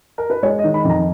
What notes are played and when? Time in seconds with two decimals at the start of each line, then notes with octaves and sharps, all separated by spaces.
0.18 A#4
0.30 B4
0.43 G#3 C#5
0.59 D#5
0.64 D#3
0.74 B5
0.84 F2
0.90 A#5